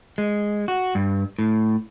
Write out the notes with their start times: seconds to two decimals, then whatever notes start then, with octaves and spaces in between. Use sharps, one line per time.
0.18 G#3
0.68 F#4
0.95 G2
1.39 A2